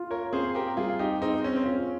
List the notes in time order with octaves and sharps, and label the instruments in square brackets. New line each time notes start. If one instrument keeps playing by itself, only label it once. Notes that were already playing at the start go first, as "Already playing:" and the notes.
Already playing: [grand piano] F4
[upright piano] A#4 C#5
[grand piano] C4 [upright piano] G#4 C5
[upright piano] G4 A#4
[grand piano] G3 [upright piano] F4 G#4
[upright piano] D#4 G4
[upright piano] C4 D#4 [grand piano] G#4
[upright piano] C4
C#4
C4
[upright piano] C#4 [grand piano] F4